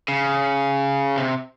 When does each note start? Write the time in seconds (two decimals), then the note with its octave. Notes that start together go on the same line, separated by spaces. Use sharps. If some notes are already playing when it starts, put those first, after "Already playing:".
0.08 C#3
1.17 C3